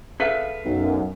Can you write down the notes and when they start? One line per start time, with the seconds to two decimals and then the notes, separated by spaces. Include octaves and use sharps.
0.20 G#4 A4 B4 E5 F5 B6
0.65 B1 F#2